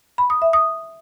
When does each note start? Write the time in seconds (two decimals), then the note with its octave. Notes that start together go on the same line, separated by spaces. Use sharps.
0.18 B5
0.30 D#6
0.42 E5
0.53 D#6